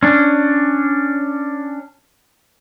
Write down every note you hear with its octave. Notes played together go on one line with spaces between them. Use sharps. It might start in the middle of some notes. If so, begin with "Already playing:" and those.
C#4 D4